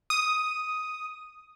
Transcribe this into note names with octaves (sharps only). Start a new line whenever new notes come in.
D#6